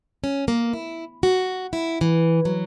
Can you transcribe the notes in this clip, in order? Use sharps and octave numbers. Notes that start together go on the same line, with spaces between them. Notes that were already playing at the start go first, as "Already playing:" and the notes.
C#4
A#3
E4
F#4
E4
E3
F#3